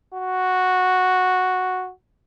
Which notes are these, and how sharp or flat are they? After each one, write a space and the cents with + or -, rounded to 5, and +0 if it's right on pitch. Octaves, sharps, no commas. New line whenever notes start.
F#4 -5